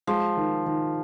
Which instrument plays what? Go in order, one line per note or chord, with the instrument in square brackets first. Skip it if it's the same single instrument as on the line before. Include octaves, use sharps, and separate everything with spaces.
[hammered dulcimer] F3 [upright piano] G#3
[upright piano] D#3
D#3